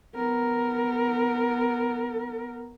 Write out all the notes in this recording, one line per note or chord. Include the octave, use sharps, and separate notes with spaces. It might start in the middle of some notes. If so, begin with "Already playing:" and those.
B3 A#4